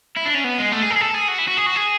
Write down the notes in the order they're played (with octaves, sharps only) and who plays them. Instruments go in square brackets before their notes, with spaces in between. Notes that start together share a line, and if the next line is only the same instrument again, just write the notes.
[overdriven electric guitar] E4
D4
C#4
B3
G#3
A3
G#4
A4
G#4
A4
G#4
F#4
E4
F#4
G#4
F#4
G#4